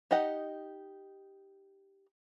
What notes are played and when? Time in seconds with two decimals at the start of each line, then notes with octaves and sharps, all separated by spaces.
0.11 D#4 G4 D#5 F#5